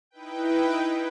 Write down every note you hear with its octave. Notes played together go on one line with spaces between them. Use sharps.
D#4 E4 B4 G5